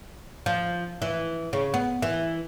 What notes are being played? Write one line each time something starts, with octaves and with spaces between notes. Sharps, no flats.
F3
E3
C#3
B3
E3